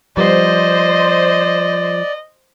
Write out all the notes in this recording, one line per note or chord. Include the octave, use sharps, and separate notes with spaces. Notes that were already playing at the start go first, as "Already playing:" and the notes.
F3 G3 B3 C5 D5 D#5